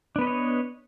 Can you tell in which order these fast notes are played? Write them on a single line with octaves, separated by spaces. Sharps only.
D4 B3 B4 D#5 C#5